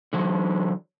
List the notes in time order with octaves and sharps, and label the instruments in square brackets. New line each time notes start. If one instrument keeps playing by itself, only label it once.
[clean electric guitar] D3 E3 F#3